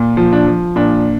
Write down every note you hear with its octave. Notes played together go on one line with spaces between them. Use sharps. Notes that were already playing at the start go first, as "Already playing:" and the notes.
Already playing: A#2
F3
D4
F3
A#2 D4